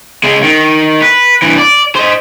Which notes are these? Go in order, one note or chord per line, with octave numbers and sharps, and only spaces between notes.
C#3 G#3
D#3
B4
G2 E3
D5
C5 D#5